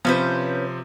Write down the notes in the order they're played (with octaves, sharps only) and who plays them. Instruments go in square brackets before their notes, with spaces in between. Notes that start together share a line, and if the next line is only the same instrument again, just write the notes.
[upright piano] C3 F3 [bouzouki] C#4 B4 C5